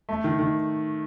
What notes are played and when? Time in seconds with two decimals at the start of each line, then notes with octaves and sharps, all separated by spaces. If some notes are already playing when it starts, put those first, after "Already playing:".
0.09 A3
0.24 D#3
0.39 D#3